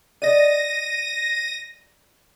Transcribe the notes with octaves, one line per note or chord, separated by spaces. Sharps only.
D5 D#5 A#6 D#7